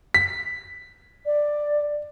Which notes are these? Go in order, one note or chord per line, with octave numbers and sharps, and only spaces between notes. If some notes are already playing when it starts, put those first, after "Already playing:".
B6
D5